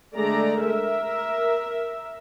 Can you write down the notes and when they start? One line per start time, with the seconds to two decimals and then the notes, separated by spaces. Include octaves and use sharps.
0.15 D3 G#3 A3 D5 A#5
0.63 A#4 E5